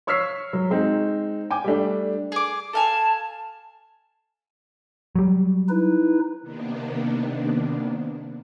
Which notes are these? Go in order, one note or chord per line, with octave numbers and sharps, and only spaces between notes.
C#5 C#6 E6 F6 B6 C7
F#3
G#3 C4 D#4
G5 G#5 D6
G3 A3 D4
G#4 D6
A4 F5 G#5 A5
F#3 G3
D#4 E4 B4
C3 D#3 A#3 B3 D4